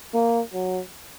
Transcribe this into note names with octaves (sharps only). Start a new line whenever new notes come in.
A#3
F#3